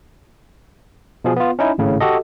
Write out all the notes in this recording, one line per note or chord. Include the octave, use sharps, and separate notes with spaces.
B2 F3 G#4
B3 F4
C#4 D#4 E4
G#1 A2 C#3
F#4 G4 A4 D#5